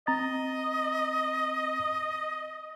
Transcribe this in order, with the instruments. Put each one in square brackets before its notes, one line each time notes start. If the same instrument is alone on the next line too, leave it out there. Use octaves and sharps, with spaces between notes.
[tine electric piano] C4 A#5 A6 [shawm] D#5